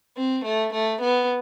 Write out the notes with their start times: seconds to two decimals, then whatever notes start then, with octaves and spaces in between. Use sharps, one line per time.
0.17 C4
0.45 A3
0.73 A3
1.02 B3